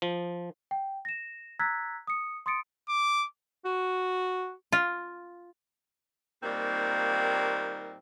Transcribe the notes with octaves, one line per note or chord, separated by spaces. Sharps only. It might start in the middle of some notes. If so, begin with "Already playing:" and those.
F3
G5
A#6 E7
A#5 E6 F#6 G#6 A6 B6
D#6 C#7
C6 D#6 A6 C#7 D7
D6
F#4
F4
A#2 D#3 G3 A#3 C4 D#4